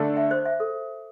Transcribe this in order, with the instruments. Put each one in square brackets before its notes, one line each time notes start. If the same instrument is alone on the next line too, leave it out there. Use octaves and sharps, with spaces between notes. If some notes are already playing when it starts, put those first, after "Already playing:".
Already playing: [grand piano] D3 A3 D4 A4 D5
[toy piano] E5
C5
E5
A4